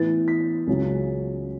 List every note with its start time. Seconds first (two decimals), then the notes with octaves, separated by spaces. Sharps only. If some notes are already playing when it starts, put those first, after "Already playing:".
Already playing: A2 E3 B3 E4 A6
0.28 B6
0.67 C#2 C#3 F#3 C#4